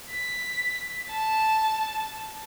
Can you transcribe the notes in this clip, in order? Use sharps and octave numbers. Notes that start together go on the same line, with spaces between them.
B6
A5